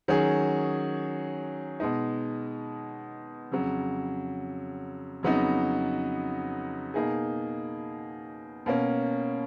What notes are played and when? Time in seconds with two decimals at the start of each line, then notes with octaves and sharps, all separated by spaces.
0.08 D#3 F#3 C#4 G#4
1.80 B2 G#3 D#4
3.52 F2 C#3 F#3
5.23 F2 C#3 F#3 B3 D#4
6.94 B2 A#3 D#4 G#4
8.66 B2 A#3 C#4